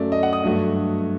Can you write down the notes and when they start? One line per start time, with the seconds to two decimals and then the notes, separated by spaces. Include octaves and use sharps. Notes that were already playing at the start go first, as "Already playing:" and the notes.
Already playing: F#2 F#3 A3 D5
0.12 D#5
0.23 F#5
0.33 D#6
0.44 G2 F#3 A3